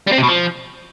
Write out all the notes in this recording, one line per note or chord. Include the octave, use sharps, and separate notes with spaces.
G3
C4
C3
B2
F3